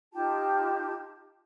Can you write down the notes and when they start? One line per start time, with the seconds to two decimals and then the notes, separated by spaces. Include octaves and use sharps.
0.13 D#4 F4 G4 A5